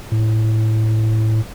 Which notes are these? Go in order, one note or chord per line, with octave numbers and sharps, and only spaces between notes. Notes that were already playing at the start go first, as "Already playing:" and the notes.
A2